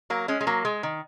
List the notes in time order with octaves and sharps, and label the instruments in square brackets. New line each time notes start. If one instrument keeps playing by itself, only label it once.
[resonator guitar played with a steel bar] F#3 A#3
G#3 C#4
G#3
F#3 A#3
G#3
D#3